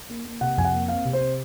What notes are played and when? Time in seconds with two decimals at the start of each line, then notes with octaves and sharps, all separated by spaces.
0.09 A#3
0.25 A#3
0.41 C3 F#5
0.57 F2 G#5
0.65 F#5
0.73 A#3
0.88 C4 F5
1.05 C3
1.13 C5
1.21 C4